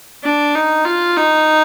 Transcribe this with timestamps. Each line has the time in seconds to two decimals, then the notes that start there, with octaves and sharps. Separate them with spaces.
0.24 D4
0.55 D#4
0.85 F4
1.17 D#4